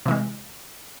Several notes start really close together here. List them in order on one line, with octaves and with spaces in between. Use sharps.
C3 E3 G#3